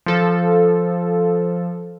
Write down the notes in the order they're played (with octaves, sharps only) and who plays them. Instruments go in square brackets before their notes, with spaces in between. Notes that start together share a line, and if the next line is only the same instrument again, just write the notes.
[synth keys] F3 A4